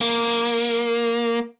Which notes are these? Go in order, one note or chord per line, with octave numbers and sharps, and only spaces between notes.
A#3